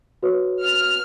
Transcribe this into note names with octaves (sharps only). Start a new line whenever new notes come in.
F#4 B4 C#5
F6